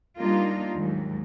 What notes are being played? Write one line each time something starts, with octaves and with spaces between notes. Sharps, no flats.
G3 A#3 D4 D#4 F4
D#2 G#2 F#3